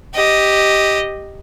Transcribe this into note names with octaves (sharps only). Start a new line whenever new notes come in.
G4 D#5